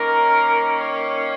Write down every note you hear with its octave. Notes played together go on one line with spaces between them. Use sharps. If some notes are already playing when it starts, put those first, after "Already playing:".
Already playing: D#3 A#3 C#4 A#4
C#5